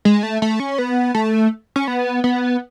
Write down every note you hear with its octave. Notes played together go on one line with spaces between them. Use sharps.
G#3
A3
A3
C#4
B3
A3
C#4
B3
B3